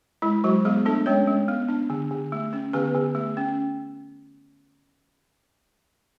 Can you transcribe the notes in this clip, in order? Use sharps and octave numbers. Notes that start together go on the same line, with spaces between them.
G#3 E4
F#3 G#3 F#4
G#3 B3 G#4
A3 D4 A4
G#3 C#4 C#5
G#3
B3
D4
D3
D3
A3
C#4
D3 B3 B4
D3
A3
C#4